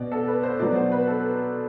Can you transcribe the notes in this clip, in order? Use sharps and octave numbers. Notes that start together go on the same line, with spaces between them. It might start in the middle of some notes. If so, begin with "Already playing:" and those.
Already playing: B2 D5
A4
B4
C5
B2 F#3 D5
C5
B4
A4